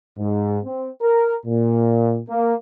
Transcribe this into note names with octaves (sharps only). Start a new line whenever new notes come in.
G#2
C4
A#4
A#2
A#3